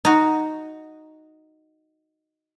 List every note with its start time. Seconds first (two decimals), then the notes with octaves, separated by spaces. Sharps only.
0.05 D#4 F#4